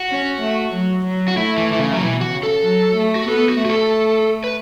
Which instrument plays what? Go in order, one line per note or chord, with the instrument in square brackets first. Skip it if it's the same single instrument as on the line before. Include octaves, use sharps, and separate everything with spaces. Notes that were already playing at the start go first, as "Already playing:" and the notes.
Already playing: [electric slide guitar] F#4
[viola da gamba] C#4
A3
F#3
F#3
[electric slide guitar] F#4
[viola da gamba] A3 [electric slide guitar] E4
[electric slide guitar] E3
E3
C#3
F#3
[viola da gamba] B2 [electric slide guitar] E3
[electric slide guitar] F#4
[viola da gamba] C#3
[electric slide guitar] A4
[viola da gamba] F#3
A3
[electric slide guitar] F#4
[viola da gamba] B3 [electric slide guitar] A4
[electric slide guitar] F#4
[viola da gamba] A3
[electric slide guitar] F#4
A4
B4